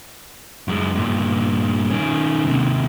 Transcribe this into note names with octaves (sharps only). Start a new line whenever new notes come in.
F#2 G#3
G2 A#2
D#3 C#4
D#2 C3